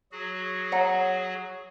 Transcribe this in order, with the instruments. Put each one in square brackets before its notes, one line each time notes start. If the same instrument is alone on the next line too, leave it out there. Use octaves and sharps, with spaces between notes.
[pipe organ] F#3 F#4 G#4
[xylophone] C#5 F#5 A#5